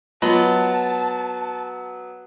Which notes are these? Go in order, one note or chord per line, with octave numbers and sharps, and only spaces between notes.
F#3 B3 F4 D#5 A5 B5